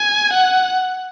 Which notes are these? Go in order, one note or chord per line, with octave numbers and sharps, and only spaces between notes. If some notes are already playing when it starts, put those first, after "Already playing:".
Already playing: G#5
F#5